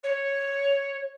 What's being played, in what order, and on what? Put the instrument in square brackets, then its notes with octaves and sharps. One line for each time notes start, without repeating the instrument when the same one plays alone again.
[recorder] C#5